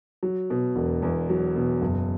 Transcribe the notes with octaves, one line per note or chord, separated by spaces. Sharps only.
F#3
B2
E1
E2
F#3
B2
F#1